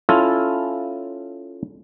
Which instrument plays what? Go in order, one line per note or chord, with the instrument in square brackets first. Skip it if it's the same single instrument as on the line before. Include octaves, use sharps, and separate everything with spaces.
[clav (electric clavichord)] C#4 E4 F4 A4